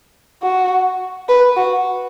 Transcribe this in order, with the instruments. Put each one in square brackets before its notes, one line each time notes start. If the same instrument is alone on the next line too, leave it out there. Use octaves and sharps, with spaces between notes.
[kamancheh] F#4
B4
F#4